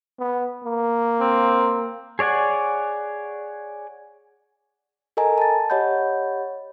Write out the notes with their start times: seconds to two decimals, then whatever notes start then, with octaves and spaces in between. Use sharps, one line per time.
0.19 B3
0.64 A#3
1.20 C4
2.19 G#4 C#5 D5 F#5 G#5
5.17 A4 A#4 D#5 G#5 A#5
5.38 A5 A6
5.70 G4 C#5 D#5 F#5 B5 G6